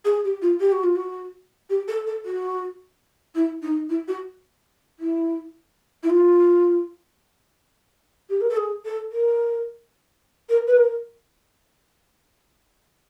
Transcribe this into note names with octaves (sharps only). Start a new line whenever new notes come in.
G#4
G4
F4
G4
F#4
F4
F#4
G4
A4
A4
F#4
E4
D#4
E4
F#4
E4
E4
F4
G4
A#4
A4
G#4
A4
A#4
A#4
B4
A#4